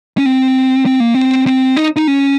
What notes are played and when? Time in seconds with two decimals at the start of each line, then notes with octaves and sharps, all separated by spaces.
0.18 C#4
0.26 C4
0.86 C4
1.00 A#3
1.14 C4
1.47 C4
1.77 D#4
1.96 D#4
2.07 C#4